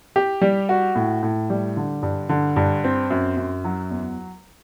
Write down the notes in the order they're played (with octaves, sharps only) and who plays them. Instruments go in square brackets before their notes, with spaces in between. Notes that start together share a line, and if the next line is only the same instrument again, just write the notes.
[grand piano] G4
G3
F#4
A2
A2
G3
D3
G2
D3
G2
C4
F#2
F#2
F#3
E2